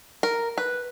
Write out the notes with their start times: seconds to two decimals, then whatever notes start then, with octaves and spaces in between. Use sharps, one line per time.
0.23 A#4
0.58 B4